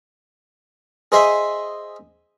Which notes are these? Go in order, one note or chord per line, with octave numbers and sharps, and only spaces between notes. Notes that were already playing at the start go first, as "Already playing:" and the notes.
G#4 C5 D#5 E5 G#5